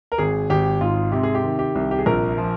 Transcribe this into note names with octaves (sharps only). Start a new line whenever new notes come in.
A#4
G#1 G#4
G#1 G4
G#2 F4
C3 G4
G#4
G4
D#3
G4
C2
G4
G#4
A#1 A#4
F3